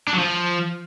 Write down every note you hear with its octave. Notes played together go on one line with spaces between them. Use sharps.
D4
F#3
F3